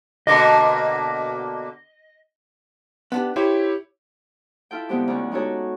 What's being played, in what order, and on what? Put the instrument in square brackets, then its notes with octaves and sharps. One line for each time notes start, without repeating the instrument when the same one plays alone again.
[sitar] B2 D3 A#3 [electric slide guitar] D#5
[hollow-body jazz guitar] B3 D4 G4
[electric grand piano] E4 G4 C#5 [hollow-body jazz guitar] C5
[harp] E4 F4 A4 G5
D3 G#3 B3 C4 G4
D2 C#4 D5 C#6
G#3 D#4 F#4 G4 A4 C#5